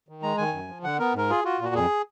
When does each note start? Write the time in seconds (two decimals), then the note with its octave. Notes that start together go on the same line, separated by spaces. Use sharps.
0.09 D#3
0.23 G#3 A#5
0.38 D#3 G#5
0.53 F#2
0.68 F3
0.83 D3 F#5
0.99 B3 A#4
1.14 G#2 A#4
1.30 F4 G#4
1.44 F4 F#4
1.59 A#2 F#4
1.75 F2 G#4